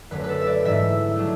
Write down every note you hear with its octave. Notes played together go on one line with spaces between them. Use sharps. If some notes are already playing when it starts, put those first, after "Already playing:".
F#2 D3 F#3 A3 D4 B4
B4
A4
E5
D5
G#2 E3 A3 E5
F#3 A3 D4